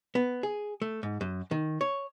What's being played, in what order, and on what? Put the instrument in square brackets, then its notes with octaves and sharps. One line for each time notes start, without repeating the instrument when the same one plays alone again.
[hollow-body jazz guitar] B3
G#4
A3
G#2
F#2
D#3
C#5